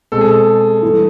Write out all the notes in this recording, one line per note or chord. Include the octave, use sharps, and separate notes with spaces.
B2 G#3 C4 A4
G#4
A4
G2 E3 A3